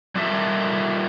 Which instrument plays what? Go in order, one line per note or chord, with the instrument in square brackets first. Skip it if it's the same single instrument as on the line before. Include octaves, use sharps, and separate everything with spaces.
[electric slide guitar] G3 F4 A4 A#4 E5